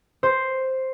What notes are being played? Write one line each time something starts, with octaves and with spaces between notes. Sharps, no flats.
C5